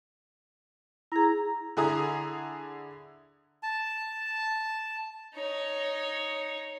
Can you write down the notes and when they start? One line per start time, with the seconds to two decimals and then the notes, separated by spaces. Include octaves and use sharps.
1.12 E4 G#4 A#5
1.77 D3 E4 G#4 A#5 D#6
3.63 A5
5.34 D#4 C#5